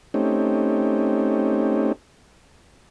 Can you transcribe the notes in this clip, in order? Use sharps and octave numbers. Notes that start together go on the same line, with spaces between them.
A3 C4 C#4 D#4 G4